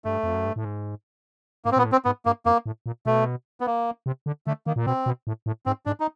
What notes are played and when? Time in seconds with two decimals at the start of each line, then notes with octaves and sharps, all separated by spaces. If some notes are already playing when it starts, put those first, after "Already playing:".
0.04 G2 A3
0.23 F2
0.34 F#2
0.45 G2
0.56 A2
0.65 G#2
1.65 G#2 A#3
1.72 C4
1.76 A#2 B3
1.85 A2
1.92 C4
2.05 G#2 B3
2.25 G2 A#3
2.46 F2 A#3
2.66 A2
2.86 A#2
3.06 B2 A3
3.60 B3
3.66 A#3
4.06 C3
4.26 D3
4.47 D3 A3
4.66 D#3 A#3
4.76 A#2
4.86 B2 C4
5.06 B2
5.27 A2
5.46 A2
5.66 G#2 C4
5.86 G#2 D4
6.00 D#4